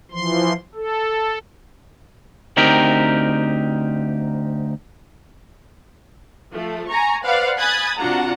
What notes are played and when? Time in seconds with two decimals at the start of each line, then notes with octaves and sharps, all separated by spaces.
0.11 E3 F3 C6
0.75 A4
2.57 D2 C4 D#4 G4 A#4
6.54 F3 A3
6.89 G#5 A#5 C#6
7.24 B4 C5 D5 F5 F#5
7.58 G#5 B5 D#6 F#6 G#6 A6
7.97 C3 D4 F4 F#4 F#5 A#5